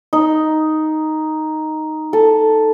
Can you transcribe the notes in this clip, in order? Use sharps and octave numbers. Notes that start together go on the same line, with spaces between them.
D#4
A4